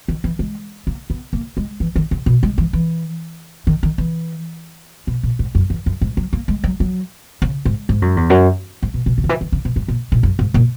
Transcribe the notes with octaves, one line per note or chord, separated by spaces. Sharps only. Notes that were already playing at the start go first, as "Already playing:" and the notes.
D#3
E3
G#3
A#3
B3
A#3
G#3
E3
D#3
C#3
B2
G#3
E3
E3
D#3
D#3
E3
B2
A#2
G#2
F#2
E2
F#2
G#2
F#3
A#3
G#3
F#3
F#3
C#3
G#2
G#2
F#2
E2
F#2
G#2
B2
B2
C#3
D#3
E3
D#3
C#3
B2
G#2
A#2
A#2
F#2
G#2
A#2